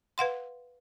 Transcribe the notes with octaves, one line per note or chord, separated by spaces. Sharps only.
B4 F5 F#5 C6